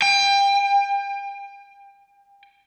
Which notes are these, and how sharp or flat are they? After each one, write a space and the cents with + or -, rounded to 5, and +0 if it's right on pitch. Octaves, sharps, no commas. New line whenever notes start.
G5 +30